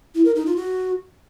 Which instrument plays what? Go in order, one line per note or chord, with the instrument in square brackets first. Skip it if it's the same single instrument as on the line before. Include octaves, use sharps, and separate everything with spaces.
[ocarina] E4
A#4
D#4
F4
F#4